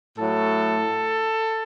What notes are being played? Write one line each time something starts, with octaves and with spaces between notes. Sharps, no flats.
A2 F#3 A4